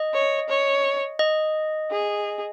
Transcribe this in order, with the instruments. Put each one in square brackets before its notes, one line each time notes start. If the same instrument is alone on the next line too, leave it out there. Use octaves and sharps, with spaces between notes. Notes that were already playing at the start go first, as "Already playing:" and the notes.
Already playing: [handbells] D#5
[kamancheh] C#5
C#5
[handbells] D#5
[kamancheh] G#4